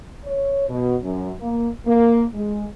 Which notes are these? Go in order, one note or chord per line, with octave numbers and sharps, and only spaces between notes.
C#5
B2
F#2
A#3
A#3
G#3